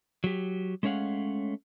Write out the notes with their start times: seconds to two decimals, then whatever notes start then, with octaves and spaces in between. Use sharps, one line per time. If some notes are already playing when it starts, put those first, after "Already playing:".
0.24 F#3 G4
0.83 G#3 A3 C#4 C#5 F5 F#5